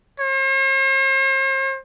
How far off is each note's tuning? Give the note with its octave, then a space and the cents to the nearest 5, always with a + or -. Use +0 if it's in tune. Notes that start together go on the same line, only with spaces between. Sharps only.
C5 +45